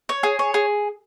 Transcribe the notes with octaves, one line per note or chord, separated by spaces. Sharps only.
C#5
G#4
C#5
G#4